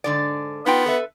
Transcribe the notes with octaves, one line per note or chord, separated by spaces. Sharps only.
G#2 D3 D5
B3 D#4 F4 G5
A4 B4 E5